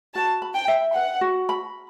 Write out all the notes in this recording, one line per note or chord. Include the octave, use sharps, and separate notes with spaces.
F#4 A5
B5
G5
E5
B4 F#5
F#4
B5